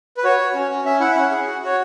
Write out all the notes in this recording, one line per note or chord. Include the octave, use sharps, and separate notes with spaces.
B4
F#4 C#5
F#4
C#4
C#4
C#4 E5
E4 F#5
E5
C#4 F#5
G#4
F#4
F#4 C#5